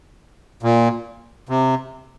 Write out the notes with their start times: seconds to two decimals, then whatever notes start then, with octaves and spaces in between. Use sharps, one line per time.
0.63 A#2
1.49 C3